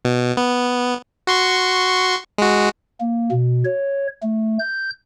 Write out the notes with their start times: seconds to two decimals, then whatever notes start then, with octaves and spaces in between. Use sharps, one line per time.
0.05 B2
0.37 B3
1.27 F#4 C6 C#6
2.38 G#3 F#4
3.00 A#3
3.31 B2
3.65 C#5
4.22 A3
4.59 G6